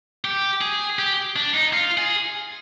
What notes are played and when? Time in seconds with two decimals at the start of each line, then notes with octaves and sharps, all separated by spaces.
0.25 G4
0.61 G#4
0.99 G4
1.36 D4
1.54 D#4
1.73 F4
1.98 G#4